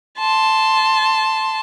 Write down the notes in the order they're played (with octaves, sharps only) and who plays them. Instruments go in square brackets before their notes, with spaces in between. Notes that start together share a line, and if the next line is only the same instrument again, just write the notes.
[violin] A5 C6